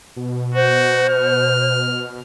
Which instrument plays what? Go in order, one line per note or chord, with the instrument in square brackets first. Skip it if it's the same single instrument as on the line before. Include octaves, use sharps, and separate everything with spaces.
[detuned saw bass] B2
[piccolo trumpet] F#4 [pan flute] C5
[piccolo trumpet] F6